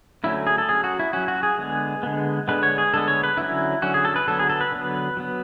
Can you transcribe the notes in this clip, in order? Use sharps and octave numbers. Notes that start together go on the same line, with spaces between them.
D3 F#3 A3 C#4 E4
G#4
A4
F#3 C#4 G#4
F#4
E4
F#3 C#4 F#4
F#4
G#4
D3 G#3 B3
D3 G#3 B3
D3 G#3 B3 B4
C#5
G#4
D3 G#3 B3 A4
C#5
B4
D3 F#3 C#4 E4
D3 F#3 C#4 F#4
G#4
A4
B4
D3 F#3 B3 A4
G#4
A4
B4
D3 F#3 B3
F#3 B3